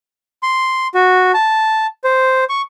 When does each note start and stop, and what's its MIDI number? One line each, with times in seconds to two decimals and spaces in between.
0.43 0.87 84
0.95 1.32 66
1.34 1.87 81
2.04 2.44 72
2.49 2.62 85